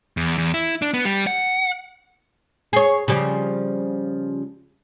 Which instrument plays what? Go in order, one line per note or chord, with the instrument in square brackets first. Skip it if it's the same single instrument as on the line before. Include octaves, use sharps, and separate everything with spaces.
[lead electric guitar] E2
E2
E4
D4
B3
G3
F#5
[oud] G#4 C#5
C#3 F3 G3